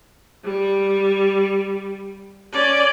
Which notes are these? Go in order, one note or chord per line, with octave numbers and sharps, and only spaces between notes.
G3
C#4 D5